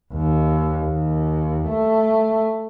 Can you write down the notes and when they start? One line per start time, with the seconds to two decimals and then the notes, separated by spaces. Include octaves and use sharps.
0.13 D#2
0.86 D#2
1.68 A3